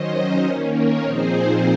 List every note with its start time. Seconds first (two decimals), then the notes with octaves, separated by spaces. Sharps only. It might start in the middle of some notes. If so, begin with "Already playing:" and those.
Already playing: D#3 F#3 C#4 C5 D#5
0.44 D#3 A#3 C#4
0.73 A#4 C#5
1.03 A#2 F3 C4 D#4 G#4 C5